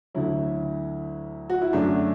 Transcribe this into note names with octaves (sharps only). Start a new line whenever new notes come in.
D2 D3 F#3 E4
F#4
E4
F#2 D3 F#3 A3 D4